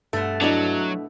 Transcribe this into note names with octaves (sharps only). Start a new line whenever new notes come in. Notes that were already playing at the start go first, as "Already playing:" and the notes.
G2 B2 A3
F#3 D4 E4 D#5